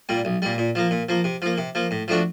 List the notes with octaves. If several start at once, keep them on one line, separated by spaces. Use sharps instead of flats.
A#2 G3
B1
A#2 G3
A#2
F3 A#3
A#2
F3 A#3
C3
F3 A#3
C3
F3 A#3
A2
F3 A3 D4 F#4